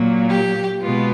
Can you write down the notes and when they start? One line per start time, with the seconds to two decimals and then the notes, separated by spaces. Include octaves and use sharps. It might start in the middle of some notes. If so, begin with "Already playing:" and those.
Already playing: A#2 F#3 A#3
0.30 G4
0.82 B2 G#3 B3 F4